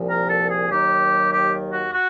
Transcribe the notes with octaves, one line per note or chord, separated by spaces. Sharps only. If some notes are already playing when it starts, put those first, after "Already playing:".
Already playing: C2 A#2 F3
A#4
A4
G#4
D#2 D#3 F#3 G4
G4
F#4
F#4